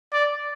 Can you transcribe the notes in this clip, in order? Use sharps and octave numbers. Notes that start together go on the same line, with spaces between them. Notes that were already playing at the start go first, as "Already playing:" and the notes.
D5